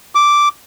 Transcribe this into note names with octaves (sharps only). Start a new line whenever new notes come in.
D6